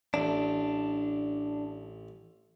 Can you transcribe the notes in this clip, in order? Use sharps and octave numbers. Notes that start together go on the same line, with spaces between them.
A1 D4